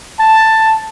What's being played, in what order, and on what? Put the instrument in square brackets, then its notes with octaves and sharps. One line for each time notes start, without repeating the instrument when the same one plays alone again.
[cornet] A5